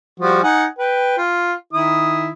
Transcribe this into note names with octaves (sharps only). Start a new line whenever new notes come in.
F3 G3 F#4
D#4 F#5 G#5
B4 G5
F4
D#3 E4 D#6